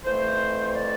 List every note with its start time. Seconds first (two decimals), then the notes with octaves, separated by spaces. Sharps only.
0.05 F2 E3 A3 C5
0.73 D5